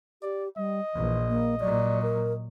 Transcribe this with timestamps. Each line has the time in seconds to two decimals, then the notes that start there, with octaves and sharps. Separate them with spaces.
0.22 G4 D5
0.57 G3 D#5
0.94 A#1 E3
1.29 A#3
1.60 A#2 F#3 D5
2.02 A#4